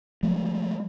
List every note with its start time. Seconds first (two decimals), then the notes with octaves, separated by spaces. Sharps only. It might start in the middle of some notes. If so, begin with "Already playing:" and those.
0.23 F3 F#3 G#3 A3